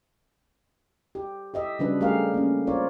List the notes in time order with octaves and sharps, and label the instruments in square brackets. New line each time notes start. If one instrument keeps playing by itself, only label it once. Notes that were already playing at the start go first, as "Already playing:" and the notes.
[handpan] G4
G4 D#5 E5
C#3 F#3 G3 D4 B4
G3 A3 G4 G#4 A#4 F5
A#3 C#4
C4 F4 A#4 C#5 D5